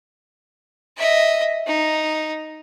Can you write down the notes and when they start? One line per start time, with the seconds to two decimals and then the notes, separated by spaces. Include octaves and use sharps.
0.97 D#5 E5
1.67 D#4